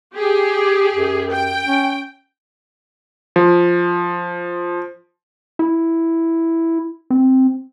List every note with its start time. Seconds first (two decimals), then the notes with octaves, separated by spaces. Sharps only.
0.14 G4 G#4
0.92 F#2
1.31 G5
1.66 C#4
3.36 F3
5.59 E4
7.10 C4